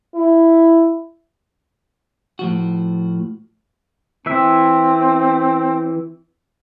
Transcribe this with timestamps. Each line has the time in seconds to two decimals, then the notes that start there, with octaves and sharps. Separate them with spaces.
0.15 E4
2.39 A2 F3 F#4
4.26 E3 C4 E4 E5